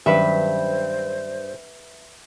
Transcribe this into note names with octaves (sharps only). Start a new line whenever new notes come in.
G2 D#3 F#3 C#4 B4 C5 E5